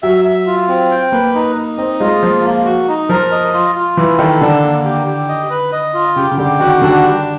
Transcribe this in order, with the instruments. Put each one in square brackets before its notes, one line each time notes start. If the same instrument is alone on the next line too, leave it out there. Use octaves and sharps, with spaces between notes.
[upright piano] F#3 [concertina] E5
[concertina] E5
F4
C4
G5
[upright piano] A#3 [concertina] B4
[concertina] D#4
D#4
[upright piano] C4 [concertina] D#5
[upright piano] G#3 [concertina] F4
[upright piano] F3 [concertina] A#3
[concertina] A#3
F#4
D#4
[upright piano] F3 [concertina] A#4
[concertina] D#5
F4
F4
[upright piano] E3 [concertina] E4
[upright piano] D#3 [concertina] A4
[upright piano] D3 [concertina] D4
[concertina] A#3
G4
G4
D#5
B4
D#5
F4
[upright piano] C#3 [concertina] G4
[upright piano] C#3
[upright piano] D3 [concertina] G4
[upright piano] D#3 [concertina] F#4
[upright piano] D3 [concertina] D4
[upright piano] G3 [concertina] G4